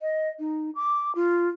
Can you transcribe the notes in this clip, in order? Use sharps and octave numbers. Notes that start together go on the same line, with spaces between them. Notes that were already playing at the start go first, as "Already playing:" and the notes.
D#5
D#4
D6
F4